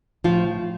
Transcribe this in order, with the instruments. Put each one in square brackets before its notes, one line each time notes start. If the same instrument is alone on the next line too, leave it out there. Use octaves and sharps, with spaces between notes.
[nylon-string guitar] A2 F3 F4